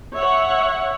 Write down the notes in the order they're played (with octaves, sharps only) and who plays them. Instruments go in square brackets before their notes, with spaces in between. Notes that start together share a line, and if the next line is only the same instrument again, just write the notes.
[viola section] C#5 E5 F#5